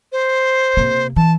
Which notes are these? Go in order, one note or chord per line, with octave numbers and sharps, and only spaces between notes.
C5
C3 A#3
E3 A5